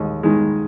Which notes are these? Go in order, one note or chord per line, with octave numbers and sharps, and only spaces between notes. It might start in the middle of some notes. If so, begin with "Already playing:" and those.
Already playing: D#2 G#3
D#3 G#3